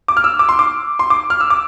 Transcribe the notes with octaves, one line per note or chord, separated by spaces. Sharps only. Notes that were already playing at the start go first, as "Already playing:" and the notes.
D6
F6
E6
D6
C6
D6
C6
D6
F6
E6
D6